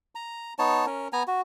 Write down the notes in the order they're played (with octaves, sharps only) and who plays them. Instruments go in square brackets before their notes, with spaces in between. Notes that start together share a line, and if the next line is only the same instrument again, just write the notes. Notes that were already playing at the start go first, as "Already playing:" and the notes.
[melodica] A#5
B3 D#4 C#5 A5
C#4 A#4
B3 G#5 A#5
F#4